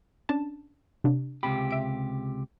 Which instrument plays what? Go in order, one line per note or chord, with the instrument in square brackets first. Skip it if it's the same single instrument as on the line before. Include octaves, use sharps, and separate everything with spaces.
[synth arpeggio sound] C#4 D4 A5
C3 D4
[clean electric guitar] C#2 C3 G4 [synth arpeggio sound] B5
[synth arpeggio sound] E5 D7